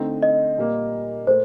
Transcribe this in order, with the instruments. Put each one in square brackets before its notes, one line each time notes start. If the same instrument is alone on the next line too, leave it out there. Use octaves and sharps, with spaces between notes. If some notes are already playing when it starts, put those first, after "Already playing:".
Already playing: [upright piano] D3 A3 C4 D#4
[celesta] D#5
[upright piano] A#2 G3 A#3
[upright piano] A#2 A3 [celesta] C5